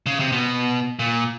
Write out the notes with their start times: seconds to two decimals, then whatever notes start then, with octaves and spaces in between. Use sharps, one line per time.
0.06 C#3
0.20 C3
0.32 B2
0.99 A#2